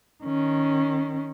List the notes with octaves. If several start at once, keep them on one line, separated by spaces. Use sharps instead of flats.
D#3 C#4